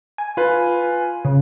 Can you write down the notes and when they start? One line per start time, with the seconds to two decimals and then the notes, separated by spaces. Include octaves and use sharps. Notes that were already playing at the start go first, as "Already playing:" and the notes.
0.18 G#5
0.37 F4 B4
1.25 C#3